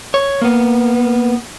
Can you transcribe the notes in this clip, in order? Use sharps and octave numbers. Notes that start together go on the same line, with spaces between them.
C#5
A#3 B3